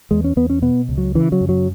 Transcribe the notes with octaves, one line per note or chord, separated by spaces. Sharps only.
E2 G#3
C#4
E2 B3
C#4
B2 B3
C#2
F#3
C#3 E3
F#3
F#2
F#3